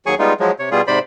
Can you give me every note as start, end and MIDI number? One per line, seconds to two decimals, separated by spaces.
0.06 0.15 39
0.06 0.15 54
0.06 0.15 68
0.06 0.15 80
0.06 0.15 85
0.19 0.33 55
0.19 0.33 56
0.19 0.33 59
0.19 0.33 63
0.19 0.33 65
0.40 0.51 53
0.40 0.51 54
0.40 0.51 56
0.59 0.69 48
0.59 0.69 73
0.71 0.81 47
0.71 0.81 55
0.71 0.81 65
0.71 0.81 68
0.87 0.99 44
0.87 0.99 48
0.87 0.99 72
0.87 0.99 74
0.87 0.99 83